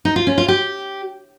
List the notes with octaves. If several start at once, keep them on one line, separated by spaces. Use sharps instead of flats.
D#4
F4
C#4
F4
G4